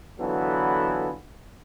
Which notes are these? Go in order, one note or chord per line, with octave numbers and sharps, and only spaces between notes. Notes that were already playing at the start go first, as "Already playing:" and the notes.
D3 E3 F#3 B3 F4 A4